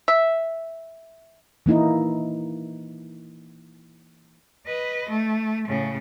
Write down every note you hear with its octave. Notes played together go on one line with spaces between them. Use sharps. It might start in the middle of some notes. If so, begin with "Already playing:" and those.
E5
E3 A#3 D#4 E4
B4 D#5
A3
A2 C#3